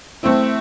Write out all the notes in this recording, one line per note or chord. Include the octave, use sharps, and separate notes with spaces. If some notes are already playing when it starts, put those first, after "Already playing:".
A3 C4 E4